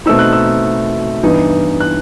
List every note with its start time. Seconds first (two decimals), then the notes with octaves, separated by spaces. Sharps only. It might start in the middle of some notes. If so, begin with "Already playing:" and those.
0.06 B2 A3 C4 D#4 E6
0.19 F#6
0.33 E6
1.23 G2 E3 B3 D#4
1.80 F#6